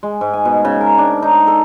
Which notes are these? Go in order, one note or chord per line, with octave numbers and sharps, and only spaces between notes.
G#3
G#2
G#5
B2
C#3
A#4
D4
D#4
A4